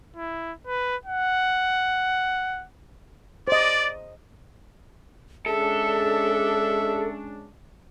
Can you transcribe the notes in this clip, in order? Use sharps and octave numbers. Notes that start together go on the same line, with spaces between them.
E4
B4
F#5
C5 D5 D#5
G#3 C#4 D4 G#4 A4 E5